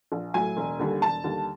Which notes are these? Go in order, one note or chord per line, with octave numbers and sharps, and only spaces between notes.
A#1
A2 F#3 G#5
E1
D#2 D3 G3
E1 A5
D#2 D3 G3